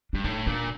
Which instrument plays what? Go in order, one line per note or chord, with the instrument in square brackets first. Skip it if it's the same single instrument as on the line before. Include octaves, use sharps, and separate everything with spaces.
[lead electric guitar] G2 [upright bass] D4
[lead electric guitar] A2 [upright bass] D#4
[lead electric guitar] A#2 [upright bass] D4